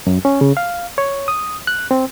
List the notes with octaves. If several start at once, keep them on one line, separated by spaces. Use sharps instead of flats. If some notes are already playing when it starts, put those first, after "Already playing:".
F#2
C#4
C#3
F5
C#5
D#6
F#6
C4